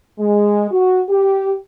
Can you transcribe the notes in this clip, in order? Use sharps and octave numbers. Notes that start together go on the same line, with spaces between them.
G#3
F#4
G4